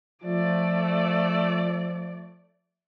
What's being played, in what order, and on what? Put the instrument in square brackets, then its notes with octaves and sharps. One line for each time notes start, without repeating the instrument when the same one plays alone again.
[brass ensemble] F3 [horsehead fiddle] A3 D5